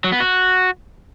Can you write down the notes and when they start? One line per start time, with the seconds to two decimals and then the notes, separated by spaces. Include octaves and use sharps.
0.04 F#3
0.12 B3
0.20 F#4